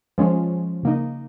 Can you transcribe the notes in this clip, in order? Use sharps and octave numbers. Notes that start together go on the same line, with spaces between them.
F3 G#3 C#4
C#3 A#3 D#4